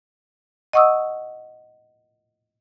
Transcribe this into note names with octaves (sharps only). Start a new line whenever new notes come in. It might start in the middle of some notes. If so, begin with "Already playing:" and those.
D#5 F#5 C#6 D#6 E6